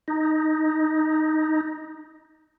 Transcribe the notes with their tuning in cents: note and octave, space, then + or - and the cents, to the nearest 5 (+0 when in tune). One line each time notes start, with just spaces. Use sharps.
D#4 +0